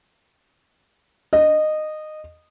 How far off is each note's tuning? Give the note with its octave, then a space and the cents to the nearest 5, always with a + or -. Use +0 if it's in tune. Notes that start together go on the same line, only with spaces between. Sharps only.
D#5 -15